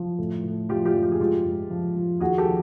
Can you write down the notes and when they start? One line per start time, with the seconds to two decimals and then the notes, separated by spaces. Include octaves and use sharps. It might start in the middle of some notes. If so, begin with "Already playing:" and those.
Already playing: F3
0.18 A2
0.44 A2
0.69 F3 F4 G4
0.86 F4 G4
0.94 F3
1.03 G4
1.11 G#4
1.20 G#2 F4 G4
1.45 G#2
1.70 F3
1.96 F3
2.20 D#2 F#4 G#4
2.38 G4 A4
2.46 F3